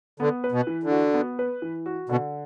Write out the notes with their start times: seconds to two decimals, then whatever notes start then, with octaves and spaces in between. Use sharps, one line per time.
0.20 D3 B3
0.44 B4
0.52 B2
0.67 E3
0.83 D3
0.91 F#4
1.14 B3
1.39 B4
1.62 E3
1.86 F#4
2.09 B2 D3